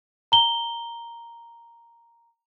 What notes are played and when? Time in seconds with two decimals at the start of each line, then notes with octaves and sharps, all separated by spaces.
0.32 A#5 G7